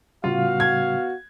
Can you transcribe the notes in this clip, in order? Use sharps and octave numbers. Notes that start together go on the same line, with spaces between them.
A2 C#3 G3 B3 F4 F#4 F5
G#6